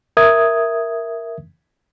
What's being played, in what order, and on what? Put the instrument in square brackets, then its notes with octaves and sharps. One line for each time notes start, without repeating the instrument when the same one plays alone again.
[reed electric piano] A#4 E5 D#6 G#6